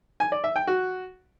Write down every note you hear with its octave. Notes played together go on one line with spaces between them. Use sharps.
G#5
D5
E5
G5
F#4